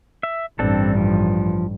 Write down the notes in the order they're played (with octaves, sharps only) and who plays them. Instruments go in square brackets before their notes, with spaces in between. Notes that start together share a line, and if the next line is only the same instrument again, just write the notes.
[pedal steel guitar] E5
[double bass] A1 G2 [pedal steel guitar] C4 D4 A4
[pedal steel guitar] F3